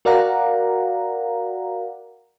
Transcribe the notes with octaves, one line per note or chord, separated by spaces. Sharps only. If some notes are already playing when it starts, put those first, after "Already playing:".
F#4 A#4 D5 F5 F#5 A#5